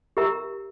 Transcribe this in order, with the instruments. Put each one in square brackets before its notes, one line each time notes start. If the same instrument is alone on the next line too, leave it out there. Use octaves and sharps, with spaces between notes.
[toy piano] G4 A#4 E5 A#5